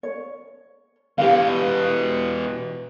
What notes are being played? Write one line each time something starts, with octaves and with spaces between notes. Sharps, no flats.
C#5
B2 E3 G4 F5